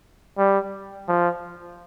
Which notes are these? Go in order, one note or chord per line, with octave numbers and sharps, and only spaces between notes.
G3
F3